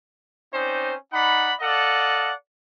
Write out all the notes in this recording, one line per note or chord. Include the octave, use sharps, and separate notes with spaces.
C4 C#4 D#4 C5 D5
D#4 D5 F#5 B5
A4 D5 D#5 F5 F#5